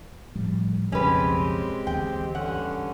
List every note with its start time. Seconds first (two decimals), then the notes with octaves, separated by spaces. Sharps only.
0.36 A2 F3 G3
0.92 B1 F2 C#3 G#3 C4 C#4 G4 B4
1.87 D2 E3 B3 G5
2.35 G2 D3 C#4 F#5